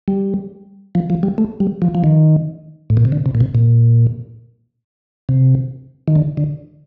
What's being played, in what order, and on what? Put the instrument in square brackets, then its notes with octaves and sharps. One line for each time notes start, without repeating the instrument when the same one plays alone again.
[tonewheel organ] G3
F3
F3
G3
A3
G3
F3
F3
D#3
A2
A#2
C3
D3
C3
A#2
C3
A#2
C3
D#3
D3
D3